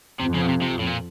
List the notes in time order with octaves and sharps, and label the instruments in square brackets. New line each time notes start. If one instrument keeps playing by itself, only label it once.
[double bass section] F2 [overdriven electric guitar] C3
[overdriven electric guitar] C#3
B2
C3
C3
A2
A#2